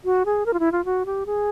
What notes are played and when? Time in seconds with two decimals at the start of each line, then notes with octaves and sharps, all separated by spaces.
0.05 F#4
0.26 G#4
0.46 A#4
0.54 F4
0.60 E4
0.72 F4
0.85 F#4
1.06 G4
1.26 G#4